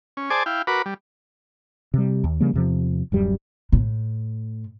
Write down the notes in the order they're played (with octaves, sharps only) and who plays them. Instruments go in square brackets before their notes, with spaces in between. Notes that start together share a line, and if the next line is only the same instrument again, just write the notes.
[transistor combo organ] C#4
G#4 C5 D5 G#5 A5 D6
E4 F5 G5
F#4 A#4 B4 B5 D6
G3
[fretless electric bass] C3 G3
D#2
C#3 F3 G3 A#3
E2 C3 F3
D1 F#2 G3
[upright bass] A2